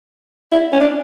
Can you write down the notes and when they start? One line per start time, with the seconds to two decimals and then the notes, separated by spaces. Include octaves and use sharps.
0.52 E4
0.73 C#4
0.80 D4